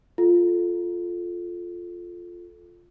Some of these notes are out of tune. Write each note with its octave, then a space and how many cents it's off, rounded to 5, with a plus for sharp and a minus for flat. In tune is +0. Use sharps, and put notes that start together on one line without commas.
F4 +0 A4 -10